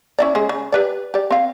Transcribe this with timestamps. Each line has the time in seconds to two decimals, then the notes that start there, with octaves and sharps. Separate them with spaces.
0.19 C#4 E4 D5
0.35 G#3 C#4 G#4
0.49 C#3
0.72 G4 B4 D5
1.14 G4 D5
1.31 C4 F5